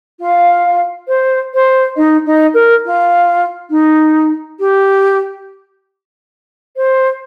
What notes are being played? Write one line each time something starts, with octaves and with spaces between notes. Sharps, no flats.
F4 F5
C5
C5
D#4 D#5
D#4 D#5
A#4
F4
D#4
G4
C5